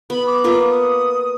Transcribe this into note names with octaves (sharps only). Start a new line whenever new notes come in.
B3 B5
D6
A#3 B3 F4
D#6